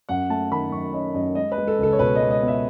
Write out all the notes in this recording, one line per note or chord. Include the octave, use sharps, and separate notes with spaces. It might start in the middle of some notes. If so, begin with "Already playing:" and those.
F#2 F#5
A3 A5
D#3 B5
F#2 C#6
C#4 D#5
F#2 D#5
G#3 D#5
B4
G#3
A4
C#2 A4
C#5
B2 B4
D#5
G#3
D#5
B3
E5